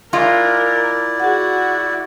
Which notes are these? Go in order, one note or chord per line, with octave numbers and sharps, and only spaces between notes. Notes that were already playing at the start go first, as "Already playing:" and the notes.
G#3 E4 F4 A#4 D5
F#4 G#4 F#5